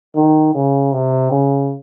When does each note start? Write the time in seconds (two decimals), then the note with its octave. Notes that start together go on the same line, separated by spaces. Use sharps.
0.15 D#3
0.54 C#3
0.92 C3
1.31 C#3